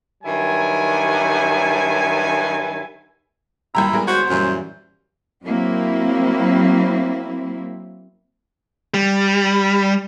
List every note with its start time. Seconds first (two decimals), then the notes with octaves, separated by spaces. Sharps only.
0.24 G2 D#3 F#3 E4 G#5
3.75 F#2 D#3 G3 A#3 E4 G5 A#5
3.93 E3 G3 G#3 B3 A#4
4.07 G1 F#4 C5
4.29 F#2 A#2 E3 G3
5.45 F#3 A#3 C4 E4
8.94 G3